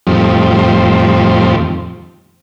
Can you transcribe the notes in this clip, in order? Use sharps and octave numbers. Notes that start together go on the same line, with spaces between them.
F2 A2 D#3 F3 G3 C4